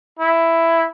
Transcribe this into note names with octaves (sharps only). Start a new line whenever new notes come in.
E4